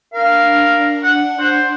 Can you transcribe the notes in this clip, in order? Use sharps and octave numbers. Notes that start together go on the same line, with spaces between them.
D4 A#4 F5
F#5
C5 F#5